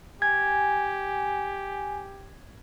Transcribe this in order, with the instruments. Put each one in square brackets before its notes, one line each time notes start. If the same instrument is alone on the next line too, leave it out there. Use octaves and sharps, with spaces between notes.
[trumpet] G4 [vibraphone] G#5 [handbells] G#6